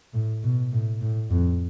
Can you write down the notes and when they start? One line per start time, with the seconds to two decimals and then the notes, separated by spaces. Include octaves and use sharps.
0.13 A2
0.43 B2
0.72 A2
1.01 A2
1.30 F2